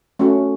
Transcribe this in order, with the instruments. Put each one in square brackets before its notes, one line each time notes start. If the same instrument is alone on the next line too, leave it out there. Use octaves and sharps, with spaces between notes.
[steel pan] A3 C#4 F#4